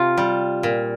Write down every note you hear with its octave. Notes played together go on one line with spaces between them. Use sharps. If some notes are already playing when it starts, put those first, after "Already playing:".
Already playing: C3 F4
G3
A#2